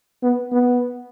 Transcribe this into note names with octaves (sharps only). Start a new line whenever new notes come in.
B3
B3